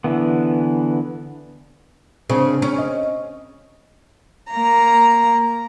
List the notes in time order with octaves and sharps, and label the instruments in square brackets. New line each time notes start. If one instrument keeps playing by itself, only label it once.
[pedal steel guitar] D3 E3 B3
[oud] C#3 [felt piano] C4 D4
[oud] C#4
[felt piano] D#5
[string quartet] A#3 A#5